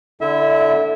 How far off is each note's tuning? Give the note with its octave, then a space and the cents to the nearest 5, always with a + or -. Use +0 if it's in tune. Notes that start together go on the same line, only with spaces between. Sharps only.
D3 +0 E4 +0 E5 -25